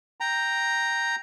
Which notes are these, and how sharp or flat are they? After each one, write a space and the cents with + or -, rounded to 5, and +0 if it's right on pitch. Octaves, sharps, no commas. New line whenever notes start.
G5 +0 A#5 +0